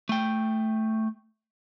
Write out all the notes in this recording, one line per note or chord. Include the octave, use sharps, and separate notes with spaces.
A3 G5